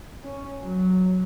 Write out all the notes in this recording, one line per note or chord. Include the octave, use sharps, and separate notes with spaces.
C#4
F#3